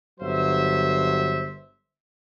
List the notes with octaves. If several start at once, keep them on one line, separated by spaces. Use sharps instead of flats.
G1 G2 F#3 C5 E5